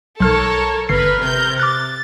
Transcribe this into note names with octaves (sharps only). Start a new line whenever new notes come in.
B1 A4 A#4 C#5 F6
G1 A#4 B4 C7
C3 G6
D6 F#6 A6